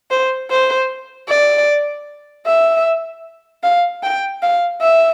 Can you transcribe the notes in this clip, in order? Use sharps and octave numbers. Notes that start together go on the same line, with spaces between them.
C5
C5
D5
E5
F5
G5
F5
E5